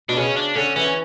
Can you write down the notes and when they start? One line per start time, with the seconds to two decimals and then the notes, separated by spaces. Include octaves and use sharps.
0.09 B2 D4
0.17 C#3 C#4
0.36 D4
0.55 D3 C#4
0.76 E3 C#4